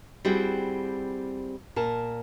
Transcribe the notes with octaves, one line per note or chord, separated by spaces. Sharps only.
G3 C4 E4 F#4 G#4
A#2 A#4 A5